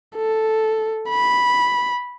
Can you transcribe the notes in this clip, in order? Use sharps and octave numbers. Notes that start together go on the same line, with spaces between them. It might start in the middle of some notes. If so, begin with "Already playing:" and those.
A4
B5